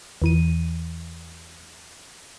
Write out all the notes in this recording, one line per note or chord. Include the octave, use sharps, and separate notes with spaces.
E2 E3 D#7